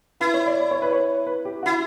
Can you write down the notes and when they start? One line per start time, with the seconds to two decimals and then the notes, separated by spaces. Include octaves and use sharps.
0.20 E4 B4
0.34 C#5
0.46 D5
0.60 D5
0.71 C#5
0.82 B4
0.92 C#5
1.26 B4
1.45 G4
1.63 F#4
1.66 E4